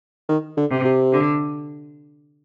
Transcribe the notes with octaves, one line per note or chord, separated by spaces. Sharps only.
D#3
D3
C3
C3
D3